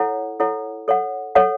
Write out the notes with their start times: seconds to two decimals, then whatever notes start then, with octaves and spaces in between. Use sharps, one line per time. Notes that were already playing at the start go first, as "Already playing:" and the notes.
Already playing: E4 A4 C#5 F#5
0.40 E4 A4 C#5 F#5
0.88 A4 C#5 F#5
1.35 A4 C#5 F#5